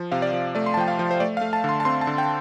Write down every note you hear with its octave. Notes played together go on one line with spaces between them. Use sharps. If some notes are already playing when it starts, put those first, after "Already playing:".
Already playing: F3
C3 F5
D5
F3
A3 D5
C6
A5
F3 G5
F5
F3
C5
A3 D5
F5
A3
A5
D3 C6
A5
C4 C6
A5
D3
G5